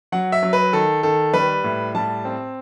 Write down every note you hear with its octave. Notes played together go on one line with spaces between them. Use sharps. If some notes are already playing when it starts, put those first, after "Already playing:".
F#3 F#5
E5
F#3
B4
D#3 A4
D#3 A4
G3 B4
A2
G3 A5
C4